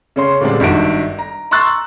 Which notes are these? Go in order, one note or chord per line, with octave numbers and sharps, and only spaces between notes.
C#3 C#4 C6
A#2 D3 G3 G#3 C4 D4
G#1 G2 D#3 F#4 E5 D7
A#5
A#5 C6 C#6 E6 F#6 A6